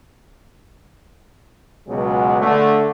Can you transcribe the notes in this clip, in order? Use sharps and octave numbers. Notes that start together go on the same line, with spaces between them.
C#2 B2 F#3 G#3
D3 A3